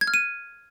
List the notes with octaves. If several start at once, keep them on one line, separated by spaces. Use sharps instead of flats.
G#6
F6
D#7